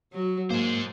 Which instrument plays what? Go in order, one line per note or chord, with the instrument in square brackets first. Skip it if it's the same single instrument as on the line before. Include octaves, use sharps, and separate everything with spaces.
[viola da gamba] F#3 F#4
[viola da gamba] G#2 [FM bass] A#3 [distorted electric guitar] G#4 C5